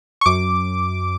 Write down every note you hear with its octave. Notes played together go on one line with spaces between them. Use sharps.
C#6
F#2 D6